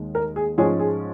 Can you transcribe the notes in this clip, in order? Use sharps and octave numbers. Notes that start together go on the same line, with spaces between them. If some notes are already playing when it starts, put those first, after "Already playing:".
Already playing: D#2 D#3 G#3
A#4
G#4
G#2 F3 G#3 C#4 G#4
G#4